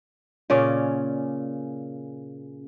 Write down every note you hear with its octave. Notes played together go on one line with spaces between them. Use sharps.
A#2 C#3 C#4 D5